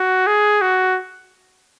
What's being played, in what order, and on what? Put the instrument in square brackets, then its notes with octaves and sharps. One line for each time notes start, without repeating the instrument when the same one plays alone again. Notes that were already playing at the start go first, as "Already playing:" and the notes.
Already playing: [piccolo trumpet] F#4
G#4
F#4